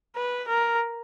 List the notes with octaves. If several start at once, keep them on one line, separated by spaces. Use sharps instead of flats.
B4
A#4